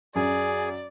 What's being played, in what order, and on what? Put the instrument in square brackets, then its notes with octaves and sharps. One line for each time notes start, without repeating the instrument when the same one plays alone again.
[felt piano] F#2 [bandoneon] G#4 [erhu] D5